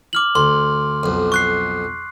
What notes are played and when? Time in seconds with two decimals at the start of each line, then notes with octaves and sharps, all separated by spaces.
0.13 D6 F6 F#7
0.35 D2 C6
1.03 B1 F2
1.32 C#6 F#6 C7